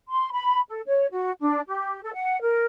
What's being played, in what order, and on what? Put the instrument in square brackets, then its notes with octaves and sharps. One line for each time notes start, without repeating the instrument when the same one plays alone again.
[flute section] C6
B5
A4
C#5
F#4
D4
G4
A4
F#5
A#4